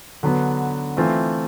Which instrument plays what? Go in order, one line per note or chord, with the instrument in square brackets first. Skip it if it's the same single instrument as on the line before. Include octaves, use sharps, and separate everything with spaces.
[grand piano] D3 F#3 B3
E3 A3 C4 F4